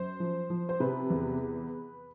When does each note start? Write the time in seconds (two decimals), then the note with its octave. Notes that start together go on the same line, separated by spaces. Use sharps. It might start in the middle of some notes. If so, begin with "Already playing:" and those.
Already playing: F#2 C5
0.20 F3
0.50 F3
0.69 C5
0.80 C3 B4
1.10 E2